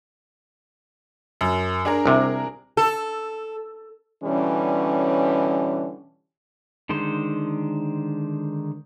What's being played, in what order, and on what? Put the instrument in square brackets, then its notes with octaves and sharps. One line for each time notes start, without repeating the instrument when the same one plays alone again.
[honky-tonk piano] F#2
D4 G#4 A#4
[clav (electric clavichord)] C2 C3
[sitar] A4
[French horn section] B2 D3 E3 G3 C#4
[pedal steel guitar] D3 D#3 G#3 C5 C6